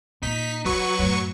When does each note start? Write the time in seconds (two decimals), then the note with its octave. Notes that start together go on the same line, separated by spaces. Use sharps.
0.23 A#2 D#4 B6
0.65 D#3 E3 F#3 B4 C#6
0.99 F#2 A2